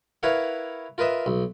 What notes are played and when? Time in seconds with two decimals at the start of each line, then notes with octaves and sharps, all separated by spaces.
0.23 E4 A#4 B4 C#5 F5 F#5
0.98 F4 A#4 B4 D#5 E5
1.26 B1